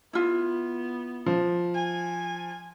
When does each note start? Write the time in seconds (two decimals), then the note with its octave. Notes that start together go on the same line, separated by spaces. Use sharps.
0.13 B3 E4 F4
1.26 F3
1.74 G#5